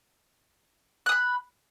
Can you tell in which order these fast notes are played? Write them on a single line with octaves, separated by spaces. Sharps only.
F#6 D#6 B5